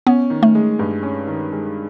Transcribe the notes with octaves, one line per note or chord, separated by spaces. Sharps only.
B3 C#4
D#3
A3
G#3
G2
C#4
D#3
G#3